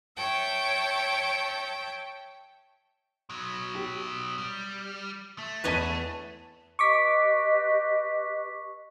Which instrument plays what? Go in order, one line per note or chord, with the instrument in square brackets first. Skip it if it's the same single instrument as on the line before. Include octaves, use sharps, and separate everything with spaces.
[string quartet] C#5 E5 G5 A5
[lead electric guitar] B2 F#3
[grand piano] G4
[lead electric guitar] G3
A3
[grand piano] E2 A5 D#7 [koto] B4 C#5 D#5
[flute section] G4 B4 D#5 [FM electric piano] C#6 D6 B6